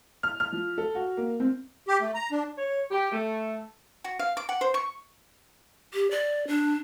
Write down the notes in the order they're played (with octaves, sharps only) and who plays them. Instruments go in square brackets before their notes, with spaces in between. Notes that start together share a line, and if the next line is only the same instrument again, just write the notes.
[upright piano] F6
F6
F3
A4
F#4
A#3
C4
[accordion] G4
A3
A#5
D4
[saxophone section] C#5
G4
A3
[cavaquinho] F#4
F5
D6
F#5
C5
C#6
[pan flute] G4
D5
D4